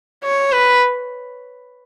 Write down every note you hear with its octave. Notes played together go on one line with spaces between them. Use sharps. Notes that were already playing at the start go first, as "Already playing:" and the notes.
C#5
B4